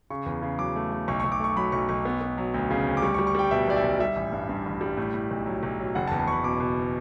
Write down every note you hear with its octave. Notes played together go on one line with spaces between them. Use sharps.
C#3 C#6
E2
C#3
F#3 D6
A3
A3
B1 C#6
B1 C#6
D6
A3 C#6
F#3 B5
B1 C#6
B1 C#6
B3
B3
F#3
D2
C#3
D2
D6
G3 C#6
C#6
G3
C#6
G3 G5
B2 E5
B1 D5
E5
B1
G3 E5
A1
G2
G2
A1
G3
A2
A2
B1
F#3
B1
F#3
F#1 F#5
A5
E2
A5
F#1 B5 C#6
B2 D6
B2